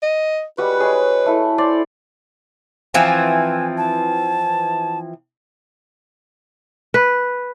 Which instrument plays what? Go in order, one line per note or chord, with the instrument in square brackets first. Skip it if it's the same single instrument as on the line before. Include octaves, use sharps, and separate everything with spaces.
[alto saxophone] D#5
[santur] G3 G#3 F#4 [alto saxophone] B4
[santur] G#3 G#4 C#5
A3 E4
C5 D5
[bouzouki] E3 F3 C4 [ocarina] G#5
[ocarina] A5
[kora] B4